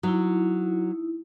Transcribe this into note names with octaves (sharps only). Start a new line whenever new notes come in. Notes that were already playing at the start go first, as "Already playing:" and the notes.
F#3 D#4 E4